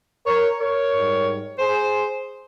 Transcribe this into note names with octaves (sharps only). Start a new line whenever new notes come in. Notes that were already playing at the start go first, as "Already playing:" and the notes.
A#4 C#5
A#4 C#5
G#2 G3
G#4 C5